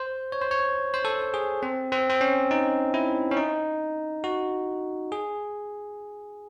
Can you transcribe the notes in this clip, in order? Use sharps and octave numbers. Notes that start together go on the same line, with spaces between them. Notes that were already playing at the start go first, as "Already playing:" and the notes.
Already playing: C5
C#5
C5
C#5
C5
A4
G#4
C4
C4
C4
C#4
D#4
E4
C#4
D#4
F#4
G#4